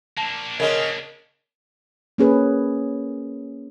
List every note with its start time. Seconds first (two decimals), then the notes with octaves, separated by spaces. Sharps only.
0.18 A#3 D4 A5
0.60 C#3 G#3 A#4 D#5
2.18 A#3 C#4 G#4 B4